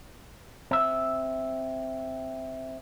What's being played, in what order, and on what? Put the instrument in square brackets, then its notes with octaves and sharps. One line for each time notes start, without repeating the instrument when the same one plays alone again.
[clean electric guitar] C4 E5